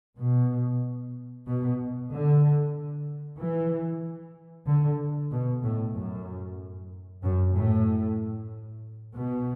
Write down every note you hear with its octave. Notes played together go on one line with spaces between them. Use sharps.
B2
B2
D3
E3
D3
B2
A2
F#2
F#2
A2
B2